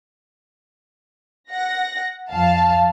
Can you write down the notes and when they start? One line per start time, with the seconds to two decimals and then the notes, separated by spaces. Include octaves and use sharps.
1.51 F#5 A#6
2.30 F2 F3 F5 A5